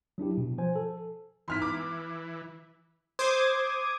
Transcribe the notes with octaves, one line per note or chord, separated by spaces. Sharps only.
F#3 D4 E4 G4
B2
F3 C5 G#5
A4
E3 C6 F6 B6
D6
C5 D6 D#6 G#6